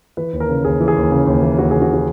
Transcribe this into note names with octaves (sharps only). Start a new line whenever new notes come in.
E3 B4
D#2
A#4
C#3
D#2 G#4
E3
G#4
D#2
C#3
D#2
E3
D#2 F#4
C#3 G#4
F#4
F#4